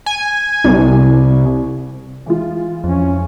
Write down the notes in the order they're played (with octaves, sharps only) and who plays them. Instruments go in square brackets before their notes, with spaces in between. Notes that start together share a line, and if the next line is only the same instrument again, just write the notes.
[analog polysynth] G#5
C2
[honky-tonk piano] E3 G#3 F4
[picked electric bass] F2 [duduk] C#4